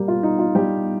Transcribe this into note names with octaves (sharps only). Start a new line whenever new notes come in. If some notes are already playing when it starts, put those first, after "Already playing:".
Already playing: G3 A#3 G4
F4
D#4
F4
G3 G4